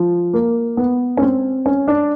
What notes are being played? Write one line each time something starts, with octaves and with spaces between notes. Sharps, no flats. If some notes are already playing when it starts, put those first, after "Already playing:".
Already playing: F3
A#3
B3
C#4
C4
C#4
D4